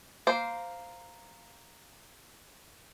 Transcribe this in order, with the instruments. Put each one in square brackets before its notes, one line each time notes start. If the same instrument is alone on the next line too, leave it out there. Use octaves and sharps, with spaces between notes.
[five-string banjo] A#3 C5